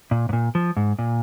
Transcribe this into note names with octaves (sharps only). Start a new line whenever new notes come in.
A#2
G#2
A#2
F3
G#2
A#2